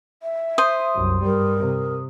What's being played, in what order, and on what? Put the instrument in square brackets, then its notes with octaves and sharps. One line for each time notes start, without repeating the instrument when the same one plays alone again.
[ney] E5
[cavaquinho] C5 [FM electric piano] D#6
[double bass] C2 F#2
[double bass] G2 G3 [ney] A#4
[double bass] C3